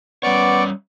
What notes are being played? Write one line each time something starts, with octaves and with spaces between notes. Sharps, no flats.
G3 B3 C#4 C#5 D5 C#6 D6